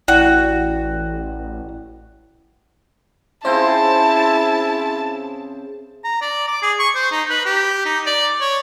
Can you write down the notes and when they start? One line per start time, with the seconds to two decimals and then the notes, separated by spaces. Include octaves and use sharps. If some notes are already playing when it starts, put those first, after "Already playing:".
0.08 A1 E4 F#4 D5 G5
3.45 C#3 C4 E4 G#4 C5 A5
6.04 A#5
6.21 D5
6.48 D6
6.62 G#4
6.79 C#6
6.95 C5
7.12 D#4
7.30 B4
7.46 G4
7.85 D#4
8.06 D5
8.41 C#5